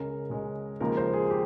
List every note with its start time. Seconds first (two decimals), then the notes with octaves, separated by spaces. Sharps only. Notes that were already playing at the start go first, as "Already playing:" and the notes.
Already playing: C#2 C#3 G#3 C#4 A#4
0.30 C#2 C#3 G#3 C#4
0.80 D#2 C#3 F3 G#3 A#4
0.97 C5
1.13 G#4
1.30 G4